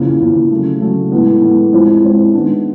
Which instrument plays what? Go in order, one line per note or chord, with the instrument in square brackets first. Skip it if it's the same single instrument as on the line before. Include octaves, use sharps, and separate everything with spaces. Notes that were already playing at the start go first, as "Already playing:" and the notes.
Already playing: [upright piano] E2 C#3 F3 A#3
E2 C#3 F3 A#3
C#3 F#3 A3
C#3 F#3 A3
A2 E3 G#3 B3
A2 E3 G#3 B3
A2 F3 G#3 C4 E4
A2 F3 G#3 C4 E4
D#3 G#3 B3 D4